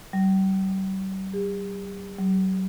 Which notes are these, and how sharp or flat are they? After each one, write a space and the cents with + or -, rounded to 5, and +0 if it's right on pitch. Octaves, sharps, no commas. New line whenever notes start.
G3 -40
G4 +45
F#3 +40